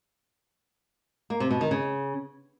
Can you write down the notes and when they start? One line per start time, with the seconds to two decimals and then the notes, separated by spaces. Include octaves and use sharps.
1.30 A#3
1.40 C3
1.51 B2
1.61 D#3
1.71 C#3